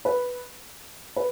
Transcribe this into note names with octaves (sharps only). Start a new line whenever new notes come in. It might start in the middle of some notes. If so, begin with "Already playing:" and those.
B4
B4